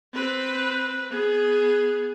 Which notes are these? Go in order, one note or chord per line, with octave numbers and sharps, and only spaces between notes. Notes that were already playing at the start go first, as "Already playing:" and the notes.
C4 B4
B3 G#4